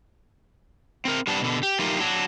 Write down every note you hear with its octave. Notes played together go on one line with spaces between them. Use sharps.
C4 A#4
G3 B3 C4 D4 A5
B2 D3
G4
F#3 A3 D#4 F4 G4 A#4
F#3 D4